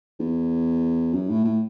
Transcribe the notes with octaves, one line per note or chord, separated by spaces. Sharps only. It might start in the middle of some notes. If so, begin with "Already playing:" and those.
E2
F#2
A2
A2